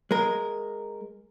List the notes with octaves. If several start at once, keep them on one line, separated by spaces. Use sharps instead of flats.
G#3 A#4